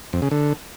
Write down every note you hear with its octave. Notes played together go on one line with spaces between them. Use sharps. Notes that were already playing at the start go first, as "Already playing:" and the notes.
F2
C#3
D3